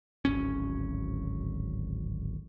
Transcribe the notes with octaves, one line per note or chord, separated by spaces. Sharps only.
D1 G#1 C#4